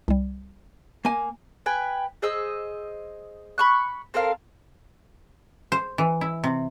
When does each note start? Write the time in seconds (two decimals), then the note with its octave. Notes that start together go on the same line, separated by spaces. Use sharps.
0.08 C2 G3
1.05 A#3 G#5
1.66 B4 G5 G#5
2.22 G#4 C5 D#5 E6
3.58 B5 C#6 F#6
4.14 C4 A4 A#4 F5
5.72 C5
5.98 E3
6.21 E4
6.44 C3